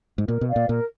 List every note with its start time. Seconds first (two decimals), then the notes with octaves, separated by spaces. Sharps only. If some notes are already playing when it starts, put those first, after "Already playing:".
0.18 G#2
0.28 A#2 A#4
0.41 B2
0.48 D5 F5
0.56 A#2
0.69 A#2 A#4